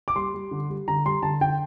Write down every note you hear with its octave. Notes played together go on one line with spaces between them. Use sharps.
D6
G3 C6
G3
D3
G3
D3 A#5
G3 C6
D3 A5
D3 G5